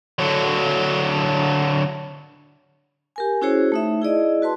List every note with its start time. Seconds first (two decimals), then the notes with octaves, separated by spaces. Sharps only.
0.19 D3 F#3
3.16 G4 A#4 G#5
3.42 C#4 E4 F#4 G#4 C5 C#5
3.72 A3 D#4 E5
4.02 E4 G#4 D5 D#5
4.42 F#4 B4 A5 C6